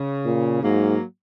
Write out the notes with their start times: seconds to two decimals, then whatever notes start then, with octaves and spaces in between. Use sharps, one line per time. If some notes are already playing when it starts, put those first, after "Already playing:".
Already playing: C#3
0.25 A#2
0.62 G#2 F#3 A#3